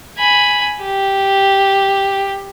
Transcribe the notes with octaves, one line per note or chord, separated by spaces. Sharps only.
G#5 B5
G4